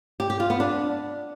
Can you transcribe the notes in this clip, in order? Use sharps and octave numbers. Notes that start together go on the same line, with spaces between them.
G4
G4
F4
B3
D4